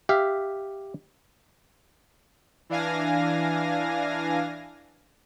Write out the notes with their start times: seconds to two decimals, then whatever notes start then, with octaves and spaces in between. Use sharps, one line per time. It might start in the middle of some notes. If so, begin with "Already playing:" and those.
0.09 G4 E5 F5
2.69 E3 D4 F5 G#5 A#6